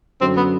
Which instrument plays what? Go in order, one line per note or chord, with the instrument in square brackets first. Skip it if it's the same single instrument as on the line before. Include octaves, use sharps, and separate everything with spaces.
[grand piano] F#2 D3 F#3 [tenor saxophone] C4
[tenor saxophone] B3